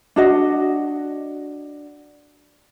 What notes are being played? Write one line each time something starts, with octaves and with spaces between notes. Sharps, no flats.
D4 F#4 D#5